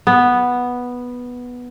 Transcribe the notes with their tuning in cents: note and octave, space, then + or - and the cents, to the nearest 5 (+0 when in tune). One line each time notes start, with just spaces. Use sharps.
B3 -5